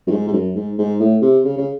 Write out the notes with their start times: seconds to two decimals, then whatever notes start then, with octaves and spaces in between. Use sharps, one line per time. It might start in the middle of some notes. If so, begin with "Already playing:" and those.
0.07 F#2
0.11 G#2
0.27 G#2
0.33 F#2
0.55 G#2
0.78 G#2
1.00 A2
1.22 C3
1.45 C#3
1.58 C#3